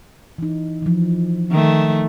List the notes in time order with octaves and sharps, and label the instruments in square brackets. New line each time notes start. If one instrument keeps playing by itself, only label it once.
[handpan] E3 D#4
E3 F3
[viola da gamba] D#3 A3